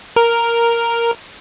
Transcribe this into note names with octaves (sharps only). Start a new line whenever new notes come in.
A#4